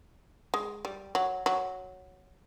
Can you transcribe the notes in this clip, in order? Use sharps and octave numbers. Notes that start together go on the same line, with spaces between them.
G#3
G3
F#3
F#3